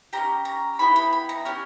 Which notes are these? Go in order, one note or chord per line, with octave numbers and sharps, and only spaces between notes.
C#4 E4 G4 A#5
A#5
B3 E4 G4 B5
B5
B5
A#5
C#4 G4 G#5